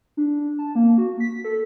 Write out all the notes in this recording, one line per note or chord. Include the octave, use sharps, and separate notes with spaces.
D4
A5
A#3
F#4
B6
A4